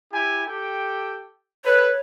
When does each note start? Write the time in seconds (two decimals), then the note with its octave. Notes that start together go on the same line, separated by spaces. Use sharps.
0.12 E4 G4 G#5
0.46 G4 A4 G5
1.65 A4 B4 C#5